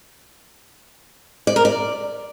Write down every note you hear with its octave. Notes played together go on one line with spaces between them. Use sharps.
D5
A#4
D5